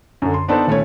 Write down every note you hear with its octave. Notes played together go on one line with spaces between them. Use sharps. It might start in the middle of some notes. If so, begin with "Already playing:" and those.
F#2 D3
C6
B3 D4 D#4 A4 B4 C5
D#1 A3 C#4 C#5